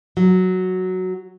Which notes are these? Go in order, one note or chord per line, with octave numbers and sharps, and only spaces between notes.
F#3